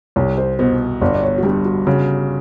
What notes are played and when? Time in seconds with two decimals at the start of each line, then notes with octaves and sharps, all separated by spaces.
0.16 C2 C#5
0.38 C5
0.59 B2 C5
1.01 G1 D5
1.15 D5
1.23 C#5
1.38 F#4
1.43 G2 G4
1.65 F#4
1.87 C#3 F#4